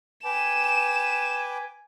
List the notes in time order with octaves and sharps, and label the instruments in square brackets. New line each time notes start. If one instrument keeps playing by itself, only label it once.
[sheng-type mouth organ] B4 G5 D6 [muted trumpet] G#5 [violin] E7